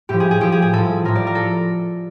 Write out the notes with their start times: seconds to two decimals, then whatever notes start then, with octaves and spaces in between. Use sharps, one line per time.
0.09 A2 F3 G4
0.20 G#4
0.31 G#4
0.41 A2 F3 G4
0.52 G#4
0.62 G#4
0.73 A2 F3 A4
1.05 A2 F3 A#4
1.15 D5
1.27 A#4
1.35 A4